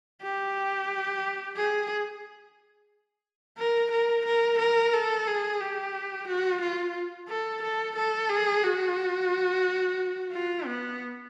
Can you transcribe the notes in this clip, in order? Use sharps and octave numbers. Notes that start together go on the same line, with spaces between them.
G4
G#4
A#4
A#4
A#4
A#4
A4
G#4
G4
F#4
F4
A4
A4
A4
G#4
F#4
F4
B3